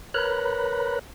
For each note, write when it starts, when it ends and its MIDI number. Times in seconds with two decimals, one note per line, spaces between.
0.14 0.99 70
0.14 0.99 71
0.14 0.99 73
0.14 0.99 82
0.14 0.99 83
0.14 0.99 90